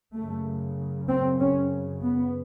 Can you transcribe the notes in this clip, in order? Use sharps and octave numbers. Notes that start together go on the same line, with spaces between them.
F#2 C#3 A3
C4
C#4
B3